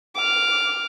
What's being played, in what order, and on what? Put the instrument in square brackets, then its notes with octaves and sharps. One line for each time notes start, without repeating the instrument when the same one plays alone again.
[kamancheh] D6 F6